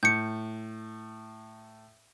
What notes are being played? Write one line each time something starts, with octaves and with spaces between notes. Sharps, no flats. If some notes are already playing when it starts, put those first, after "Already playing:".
A2 G6 C#7